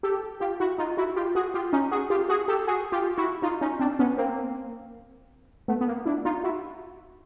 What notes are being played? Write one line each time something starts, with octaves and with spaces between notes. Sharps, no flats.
G4 A4
F4 G4
E4 F#4
D#4 F4
E4 F#4
F4 G4
F#4 G#4
F4 G4
C#4 D#4
F#4 G#4
F4 G4
F#4 G#4
G4 A4
F#4 G#4
F4 G4
E4 F#4
D#4 F4
C#4 D#4
C4 D4
B3 C#4
A#3 C4
A3 B3
B3
A#3
D4 E4
D#4 F4
E4 F#4